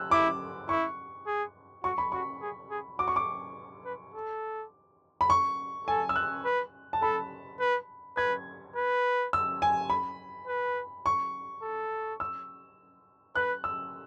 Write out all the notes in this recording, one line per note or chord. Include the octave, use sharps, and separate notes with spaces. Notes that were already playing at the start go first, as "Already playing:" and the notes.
Already playing: E6 F#6
E4 D6
E4 C#6
G#4
F#4 C#6
B5
F#4 C#6
G#4
G#4
F#4 D6
C#6
D6
B4
A4
B5
C#6
A4 G#5
E6
F#6
B4
A5
A4 B5
B4
B4 G#6
B4
E6
G#5
B5
B4
C#6
A4
E6
B4 F#6
E6